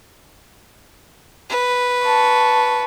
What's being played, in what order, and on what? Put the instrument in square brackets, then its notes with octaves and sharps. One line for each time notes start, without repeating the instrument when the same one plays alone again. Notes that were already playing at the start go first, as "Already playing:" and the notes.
[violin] B4
[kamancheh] A5 C#6